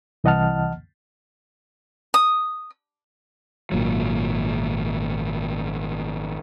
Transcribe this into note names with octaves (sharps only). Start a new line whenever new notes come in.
C2 E3 D#5 F#5 A5 F6
D#6
G#1 A#2 F#3